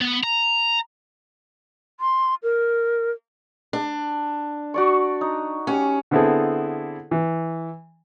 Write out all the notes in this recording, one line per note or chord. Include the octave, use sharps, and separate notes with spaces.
B3
A#5
C6
A#4
D4
F#4 D5 C#6
D#4
C#4 G4 F#5
D3 B3 C4 E4 G#4 A4
E3